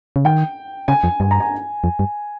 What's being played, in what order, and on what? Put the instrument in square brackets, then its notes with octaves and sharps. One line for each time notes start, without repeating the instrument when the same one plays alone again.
[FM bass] C#3
[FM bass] D#3 [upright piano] G5
[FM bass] C#3 [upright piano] G#5
[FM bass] F2
[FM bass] G2 [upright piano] G#5
[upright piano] A#5
G#5
[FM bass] F2
G2